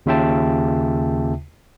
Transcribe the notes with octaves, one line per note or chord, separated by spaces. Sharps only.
D#2 C#3 F4 E5 G5 A5